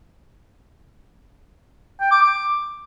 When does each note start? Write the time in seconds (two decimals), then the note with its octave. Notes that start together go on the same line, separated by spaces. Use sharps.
2.01 G5
2.11 D6
2.22 D6